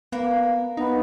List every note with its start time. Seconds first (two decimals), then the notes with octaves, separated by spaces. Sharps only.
0.12 A#3 B3
0.77 B3 D#4